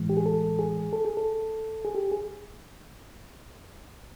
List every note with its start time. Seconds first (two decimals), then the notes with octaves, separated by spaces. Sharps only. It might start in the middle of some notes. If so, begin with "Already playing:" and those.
Already playing: A2 E3 G#3
0.09 G4
0.17 G#4
0.26 A4
0.59 G#4
0.93 A4
1.05 G#4
1.17 A4
1.85 G#4
1.95 G4
2.12 G#4